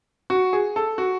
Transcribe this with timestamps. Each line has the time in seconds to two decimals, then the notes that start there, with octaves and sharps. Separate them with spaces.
0.30 F#4
0.53 G#4
0.76 A4
0.98 F#4